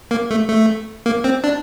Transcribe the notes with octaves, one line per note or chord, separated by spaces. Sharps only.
A#3
A3
A3
A#3
C4
D4